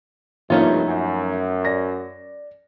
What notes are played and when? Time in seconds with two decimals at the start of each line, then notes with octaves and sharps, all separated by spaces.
0.50 C2 G2 F3 A3 A#3 C#4 D#4 F4
0.85 F#2
1.65 D5 A#6